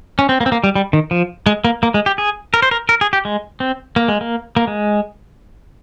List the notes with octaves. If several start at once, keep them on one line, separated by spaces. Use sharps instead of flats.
C#4
C4
A#3
C4
A#3
G3
G3
D#3
F3
G#3
A#3
A#3
G#3
G4
G#4
A#4
C5
A#4
A#4
G#4
G4
G#3
C4
A#3
G#3
A#3
A#3
G#3